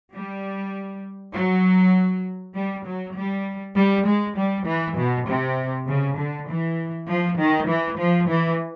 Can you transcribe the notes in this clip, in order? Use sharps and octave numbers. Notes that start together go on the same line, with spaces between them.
G3
F#3
G3
F#3
G3
G3
G#3
G3
E3
B2
C3
C#3
D3
E3
F3
D#3
E3
F3
E3